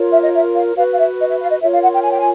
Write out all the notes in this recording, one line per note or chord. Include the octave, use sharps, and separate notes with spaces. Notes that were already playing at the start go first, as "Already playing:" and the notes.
Already playing: F4 A#4 C#5
E5
D#5
E5
F5
F#4 B4 F5
F5
E5
D#5
E5
F5
D#5
F4 A#4 C#5 E5
F5
F#5
G5
G#5
G5
G#5